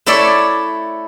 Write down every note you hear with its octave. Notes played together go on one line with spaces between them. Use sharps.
A3 E4 A4 C#5 D5 E5